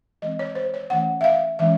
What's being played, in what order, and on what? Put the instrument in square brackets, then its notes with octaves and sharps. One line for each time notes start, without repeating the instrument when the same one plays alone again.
[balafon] E3 G#3 C4 D#5
C#5
C5
C#5
E3 A3 C#4 F#5
E5
F5
E3 G#3 C#4 E5